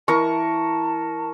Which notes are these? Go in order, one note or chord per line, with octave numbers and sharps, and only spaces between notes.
E3 A#4 A5 C#6